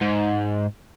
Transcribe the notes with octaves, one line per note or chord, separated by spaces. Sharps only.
G#2